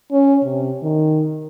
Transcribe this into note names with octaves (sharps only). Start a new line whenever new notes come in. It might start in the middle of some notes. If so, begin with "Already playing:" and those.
C#4
C3
D#3